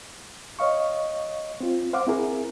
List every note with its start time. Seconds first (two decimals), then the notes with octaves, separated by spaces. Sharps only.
0.59 C#5 D#5 F5 C#6
1.61 C4 F4
1.93 C5 F5 F#5 D6
2.07 C4 E4 G#4 A#4